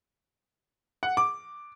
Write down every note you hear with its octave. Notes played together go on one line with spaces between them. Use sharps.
F#5
D6